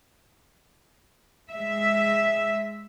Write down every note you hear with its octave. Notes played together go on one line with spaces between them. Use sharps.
G#3 E5